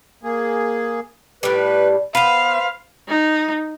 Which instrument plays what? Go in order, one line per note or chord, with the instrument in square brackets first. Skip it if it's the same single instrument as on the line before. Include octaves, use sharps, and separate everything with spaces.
[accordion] A#3 G#4
[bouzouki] A2 G3 [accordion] B4
[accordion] B3 [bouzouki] B4 C5 [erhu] F5
[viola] D#4